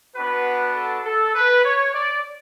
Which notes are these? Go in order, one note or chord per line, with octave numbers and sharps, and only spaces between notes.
B3 D4 F#4 B4
A4
A4
B4
C#5
D5